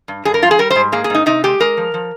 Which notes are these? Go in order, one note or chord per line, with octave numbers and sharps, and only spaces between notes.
G2
G2 G#4
A#4
F3 F4
G#4
G3 A#4
C5
G#2
A#3 G#4
G#4
G#2 D#4
C3 D#4
G#3 G4
G#3 A#4
F3
F3